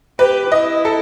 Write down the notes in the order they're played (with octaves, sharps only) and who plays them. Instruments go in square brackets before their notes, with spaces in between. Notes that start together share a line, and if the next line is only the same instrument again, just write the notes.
[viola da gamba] G4 [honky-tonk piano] B4
[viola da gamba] E4 [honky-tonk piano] D#5
[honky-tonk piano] A4